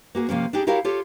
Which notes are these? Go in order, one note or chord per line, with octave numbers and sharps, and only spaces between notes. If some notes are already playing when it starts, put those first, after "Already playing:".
A#3 F#4 G#4
C3 F3 A#3 C#4
D4 D#4 G4 G#4
E4 F#4 G4 A#4 C#5 F5
F4 G4 A4 C#5